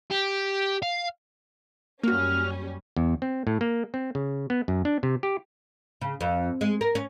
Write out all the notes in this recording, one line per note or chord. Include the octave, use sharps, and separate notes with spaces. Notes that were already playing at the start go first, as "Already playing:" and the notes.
G4
F5
F#2 G3 A#3 C#4 F#4 F6
E2
C4
A2
A#3
C4
C#3
B3
F#2
D4
C3
G4
C#3
F2
G#3
A#4
C#4